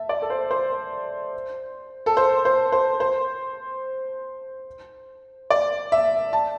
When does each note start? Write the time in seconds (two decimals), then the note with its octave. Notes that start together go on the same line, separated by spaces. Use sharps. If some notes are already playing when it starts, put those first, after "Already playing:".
Already playing: E5 A5
0.09 D5
0.22 A4
0.30 C5
0.51 C5
2.06 A4
2.17 C5
2.45 C5
2.72 C5
3.00 C5
5.50 D5
5.92 E5
6.33 A5